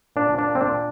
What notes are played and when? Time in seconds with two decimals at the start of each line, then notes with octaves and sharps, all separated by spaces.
0.16 A#2 D4
0.33 A#2
0.39 D4
0.49 A#3
0.55 C4
0.61 D4
0.67 A#2